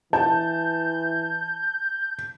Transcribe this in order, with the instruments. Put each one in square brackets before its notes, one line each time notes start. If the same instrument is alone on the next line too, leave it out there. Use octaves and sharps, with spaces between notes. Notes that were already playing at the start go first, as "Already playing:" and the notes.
[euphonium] E3 [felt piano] A5 [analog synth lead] G6